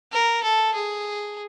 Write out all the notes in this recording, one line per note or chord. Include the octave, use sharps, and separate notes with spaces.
A#4
A4
G#4